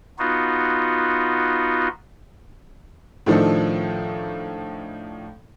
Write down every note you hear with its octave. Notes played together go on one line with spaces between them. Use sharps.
B3 D#4 F4 F#4
A2 D#3 F3 D4 D#4 A4